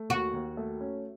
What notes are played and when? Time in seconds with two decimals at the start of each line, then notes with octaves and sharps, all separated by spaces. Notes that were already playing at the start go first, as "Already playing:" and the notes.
Already playing: A3
0.09 D#2 F#4
0.33 D#2
0.57 A3
0.80 C#4